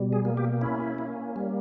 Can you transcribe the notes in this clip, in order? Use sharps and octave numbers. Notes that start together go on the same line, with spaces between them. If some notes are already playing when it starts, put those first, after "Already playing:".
Already playing: B2 G3
G#4
A#3
G4
C#4 E4
A#3
G3